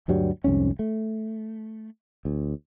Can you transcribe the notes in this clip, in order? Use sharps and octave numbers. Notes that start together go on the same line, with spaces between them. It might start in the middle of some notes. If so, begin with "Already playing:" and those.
D2 G2 F#3 G3
C2 F2 G#2 C#4
A3
D2